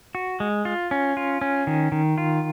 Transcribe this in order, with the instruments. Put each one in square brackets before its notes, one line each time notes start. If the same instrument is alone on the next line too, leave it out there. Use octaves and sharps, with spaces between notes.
[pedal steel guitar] F#4
G#3
F4
C#4
F4
C#4
D#3
D#3
F4